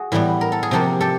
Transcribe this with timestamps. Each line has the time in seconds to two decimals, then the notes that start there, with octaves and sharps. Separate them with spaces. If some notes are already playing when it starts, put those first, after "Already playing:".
Already playing: F#4 G#4
0.12 A2 E3 G3 B3
0.41 A#4
0.52 A4
0.63 G#4
0.71 C3 F3 A#3 G4 A4
1.01 G4 A4